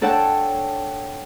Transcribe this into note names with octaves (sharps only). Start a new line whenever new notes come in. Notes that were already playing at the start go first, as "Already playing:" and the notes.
D4 A4 C#5 F#5 G5 A5